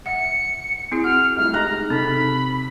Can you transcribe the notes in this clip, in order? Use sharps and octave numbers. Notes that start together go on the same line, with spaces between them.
E5 F#5 C#7
C4 E4 G#4
F#4 F#5 F6
G3 A3 E4 F6
G#3 D#4 A#5 F#6
C3 D#4 A4 B5